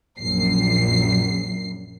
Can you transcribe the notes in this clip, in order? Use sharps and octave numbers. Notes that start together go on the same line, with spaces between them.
A#1 F#2 C7